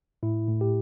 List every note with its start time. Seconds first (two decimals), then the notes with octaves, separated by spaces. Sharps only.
0.23 A2 E4
0.48 A2
0.61 G4